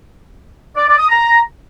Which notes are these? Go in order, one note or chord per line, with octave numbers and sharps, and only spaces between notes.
D5
D5
D#6
A#5